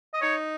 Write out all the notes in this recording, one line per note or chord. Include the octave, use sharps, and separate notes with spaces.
D#5
D#4 C#5